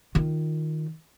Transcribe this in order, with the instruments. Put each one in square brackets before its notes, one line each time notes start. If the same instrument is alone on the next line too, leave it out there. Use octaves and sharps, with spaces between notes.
[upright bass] D#3 F4